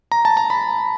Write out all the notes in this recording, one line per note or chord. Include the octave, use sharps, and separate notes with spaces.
A#5
A5
A#5
B5